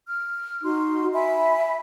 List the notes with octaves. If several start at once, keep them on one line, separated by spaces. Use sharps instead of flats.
F6
D#4 F#4 C6
E5 G#5 B5